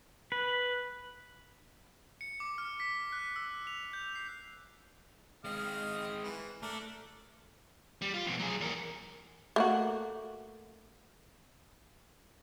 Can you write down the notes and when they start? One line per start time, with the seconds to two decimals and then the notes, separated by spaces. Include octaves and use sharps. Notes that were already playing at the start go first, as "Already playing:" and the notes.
0.32 B4
2.21 C#7
2.40 D6
2.58 F6
2.80 B6
3.12 F#6
3.36 E6
3.67 F7
3.93 G6
4.16 C7
5.44 G#3 C4 D#5 F5
6.23 E3
6.63 A3 D4 A#4
8.02 G3
8.14 F4
8.27 F2 B2
8.39 F#3 G#4
8.61 E2 A#4
9.56 A3 A#3 F#4